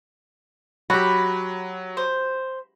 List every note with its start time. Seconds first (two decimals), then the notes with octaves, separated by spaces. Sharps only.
0.90 F#3 F#4 G4 B5
1.97 C5